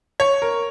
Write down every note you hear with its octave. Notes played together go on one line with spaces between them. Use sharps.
C#5
A#4